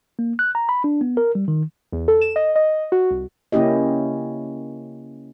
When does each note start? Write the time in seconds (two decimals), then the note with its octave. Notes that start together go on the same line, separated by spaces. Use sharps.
0.19 A#3
0.39 F#6
0.55 A#5
0.69 B5
0.84 D4
1.01 B3
1.17 A#4
1.35 G3
1.48 D#3
1.92 E2
2.08 A4
2.21 E7
2.36 D#5
2.56 D#5
2.92 F#4
3.11 C2
3.52 C#3 A#3 C#4 E4 G4 D#5